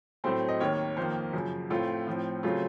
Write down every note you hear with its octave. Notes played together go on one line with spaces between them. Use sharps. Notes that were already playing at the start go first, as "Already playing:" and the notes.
A2 F#3 A3 C4 C5
D#5
D#2 D#3 A#3 C#5
F2 D#3 A#3 C5
F#2 C#3 F3
A2 A3 C4 F4
A2 F3 C4
C#3 F#3 A3 C4 F4